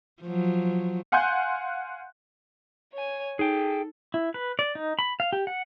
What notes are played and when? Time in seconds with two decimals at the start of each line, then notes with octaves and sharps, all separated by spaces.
0.23 F3 F#3
1.12 F5 F#5 G#5 C6 F#6 G6
2.93 C#5 G#5
3.39 D#4 G#4 A4 G5
4.14 E4
4.34 B4
4.59 D5
4.75 D#4
4.99 B5
5.20 F5
5.33 G4
5.47 F#5